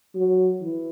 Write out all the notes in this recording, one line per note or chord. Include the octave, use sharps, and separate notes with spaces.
F#3
E3